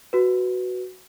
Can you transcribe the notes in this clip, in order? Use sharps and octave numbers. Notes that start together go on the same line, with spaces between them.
F#4 B4